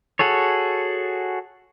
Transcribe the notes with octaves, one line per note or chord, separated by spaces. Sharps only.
F#4 G#4 A4 C#5